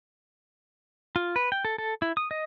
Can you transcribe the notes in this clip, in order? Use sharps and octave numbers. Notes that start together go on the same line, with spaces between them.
F4
B4
G5
A4
A4
E4
D#6
D#5